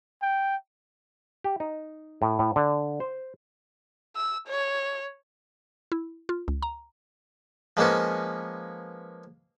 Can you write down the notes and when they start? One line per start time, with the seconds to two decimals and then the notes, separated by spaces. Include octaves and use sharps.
0.22 G5
1.44 G4
1.60 D#4
2.22 A2
2.39 A2
2.56 D3
3.00 C5
4.16 E6
4.48 C#5
5.92 E4
6.29 F4
6.48 C#2
6.62 A#5
7.77 F3 G#3 A#3 B3 C#4